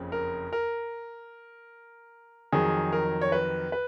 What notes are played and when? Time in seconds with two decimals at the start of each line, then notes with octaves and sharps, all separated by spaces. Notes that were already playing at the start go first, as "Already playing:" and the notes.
Already playing: F#1 F2 C#3 F3
0.12 A#4
0.53 A#4
2.52 F2 D#3 F#3 G#4
2.93 A#4
3.22 C#5
3.32 B4
3.72 B4